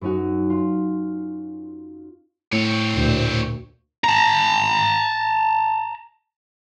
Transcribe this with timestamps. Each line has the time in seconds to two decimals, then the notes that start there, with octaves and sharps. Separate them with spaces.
0.01 F#2 C#4 D#4 F#4
0.50 F4
2.53 A2 C4 C#5
2.94 D2 A#2
4.04 A5 A#5